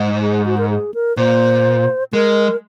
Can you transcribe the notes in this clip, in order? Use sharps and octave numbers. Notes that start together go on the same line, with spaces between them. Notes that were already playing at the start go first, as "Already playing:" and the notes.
Already playing: G#2
G#4
F#4
A#4
G#4
A#4
A#2 C5
G#3 A#4